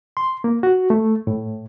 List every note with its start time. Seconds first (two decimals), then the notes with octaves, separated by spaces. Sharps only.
0.17 C6
0.44 A#3
0.63 F#4
0.90 A3
1.27 A2